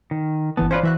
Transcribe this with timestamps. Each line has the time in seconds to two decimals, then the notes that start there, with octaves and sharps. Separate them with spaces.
0.11 D#3
0.57 G1 E3 B3 A5
0.71 C#4 F4 B4 C5 D5
0.83 E3 F#4 E5 F#6